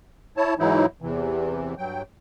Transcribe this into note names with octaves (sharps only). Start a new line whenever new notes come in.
E4 C#5 A5
G#2 E3 F#3 D#4 E4
E2 C3 E3
G2 F#3 G5